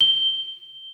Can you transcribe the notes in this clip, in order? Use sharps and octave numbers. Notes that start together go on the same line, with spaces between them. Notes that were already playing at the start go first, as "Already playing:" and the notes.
G7